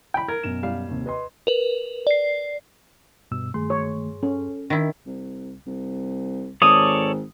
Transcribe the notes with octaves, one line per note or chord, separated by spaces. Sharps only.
G5 B5
A#4 G#6
F#2 B2 E7
G3 F5
D#2 C3
B4 D#5 C6
A#4 B4
D5 C7
G2 B2 E6
G2 D#3 A3 G#4 C6
C#5
C#4 A4
D#3 D4 E4
C2
C2
G#1 A4 C#5 D5 D#6